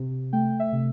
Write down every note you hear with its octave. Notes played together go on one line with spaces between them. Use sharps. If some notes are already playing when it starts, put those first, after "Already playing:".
Already playing: C3
A3 G5
E5
C3